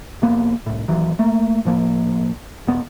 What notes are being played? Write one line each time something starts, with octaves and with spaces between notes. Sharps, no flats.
F1 F2 A#3 B3
C2 A2
D#1 D#2 E3 F#3
A3 A#3
A2 F3 A#3
D#1 B3